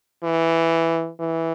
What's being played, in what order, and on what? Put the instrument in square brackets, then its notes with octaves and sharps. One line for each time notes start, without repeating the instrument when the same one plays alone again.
[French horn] E3
E3